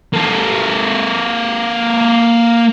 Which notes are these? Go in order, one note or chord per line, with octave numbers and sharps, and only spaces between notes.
A#3 A4